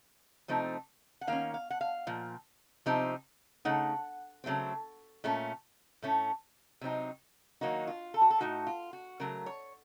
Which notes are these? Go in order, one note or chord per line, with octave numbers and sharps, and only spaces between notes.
C3 F3 A3 C4 D#4
F#5
D#3 A#3 C#4 F5
F5
F#5
F5
A#2 F3
C3 F3 C4 D#4
C#3 A3 D#4 F#5
C#3 F#3 A3 C4
A#2 A3 C#4
A2 A3 C#4
C3 F#3 C4 D#4
D#3 F#3 A#3 D#4 F#4
F4
A4
F#4
A4
A2 A3 D#4 F#4
F4
F#4
C#3 F#3 A3 A#4
C#5